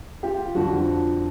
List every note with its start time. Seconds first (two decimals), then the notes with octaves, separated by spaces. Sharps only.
0.23 F4 G4
0.55 F2 D3 F3 F#4